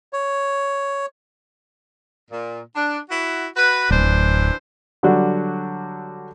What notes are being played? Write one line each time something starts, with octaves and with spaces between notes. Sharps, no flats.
C#5
A#2
D4
E4 F#4
F#4 B4
D1 E3 D4 C5
D3 F#3 G3 D4 F#4